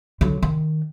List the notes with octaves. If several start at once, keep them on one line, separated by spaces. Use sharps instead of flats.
D3 F#3
D#3